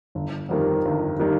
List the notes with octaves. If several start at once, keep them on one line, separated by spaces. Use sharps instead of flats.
G1
F2 D#3 G3 A#3
G1
D#3 G3 A#3